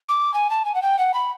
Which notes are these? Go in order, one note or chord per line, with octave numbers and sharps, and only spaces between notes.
D6
G#5
A5
G#5
F#5
G5
F#5
B5